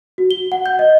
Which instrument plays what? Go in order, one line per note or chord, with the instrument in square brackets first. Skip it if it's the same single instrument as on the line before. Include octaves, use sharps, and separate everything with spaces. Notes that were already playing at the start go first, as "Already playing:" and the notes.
[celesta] F#4
G7
F#5
G6
D#5